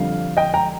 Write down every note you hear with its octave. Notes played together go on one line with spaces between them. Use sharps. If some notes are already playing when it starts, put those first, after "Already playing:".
Already playing: F2 D3 G3 F5
D#5 G5
G5 A#5